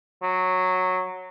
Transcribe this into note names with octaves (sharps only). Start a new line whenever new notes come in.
F#3